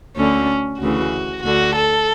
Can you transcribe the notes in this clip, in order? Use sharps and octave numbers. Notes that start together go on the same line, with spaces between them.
D2 D3 C#4
D2 C#3 E3 F#4
D2 D3 F#4
A4